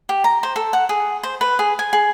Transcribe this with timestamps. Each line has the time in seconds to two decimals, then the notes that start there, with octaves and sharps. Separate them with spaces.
0.09 G4
0.24 A#5
0.43 C5
0.56 A4
0.73 F#5
0.89 G#4
1.23 C5
1.41 B4
1.59 G#4
1.79 G#5
1.93 G#4